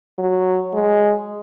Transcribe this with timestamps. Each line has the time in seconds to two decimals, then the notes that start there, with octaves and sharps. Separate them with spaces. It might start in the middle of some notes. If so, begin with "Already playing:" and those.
0.19 F#3
0.74 G#3